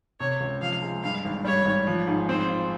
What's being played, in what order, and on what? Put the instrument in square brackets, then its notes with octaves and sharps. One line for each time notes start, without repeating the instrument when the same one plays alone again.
[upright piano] C3 [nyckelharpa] C#5
[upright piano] C#2
[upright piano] F3 [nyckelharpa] F5
[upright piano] G#3
[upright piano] G2 [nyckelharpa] F5
[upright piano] G#1
[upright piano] G3 [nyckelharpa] C#5
[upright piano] G#1
F3
G#2
[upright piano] C4 [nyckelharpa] C5
[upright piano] F4